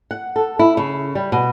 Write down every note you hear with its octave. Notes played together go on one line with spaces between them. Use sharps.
F#5
A4
E4
C#3
G3
B2